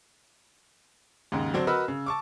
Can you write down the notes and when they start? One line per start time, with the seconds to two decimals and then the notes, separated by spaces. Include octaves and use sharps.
1.32 D#2 G#2 C#3
1.53 D3 F#3 C4 D4
1.67 F#4 A#4 B4 D#5 B5 E6
1.88 C#3
2.06 A5 C#6 D6